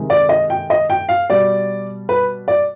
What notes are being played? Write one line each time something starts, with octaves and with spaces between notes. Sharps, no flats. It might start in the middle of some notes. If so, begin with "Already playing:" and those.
Already playing: C3 D#3 G#3
D5
D#5
G5
D#5
G5
F5
B2 G3 D5
B4
D5